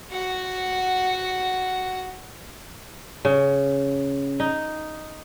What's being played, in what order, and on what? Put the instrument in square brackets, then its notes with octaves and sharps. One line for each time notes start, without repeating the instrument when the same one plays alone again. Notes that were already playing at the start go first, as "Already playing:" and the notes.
[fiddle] F#4 F#5
[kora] C#3
D#4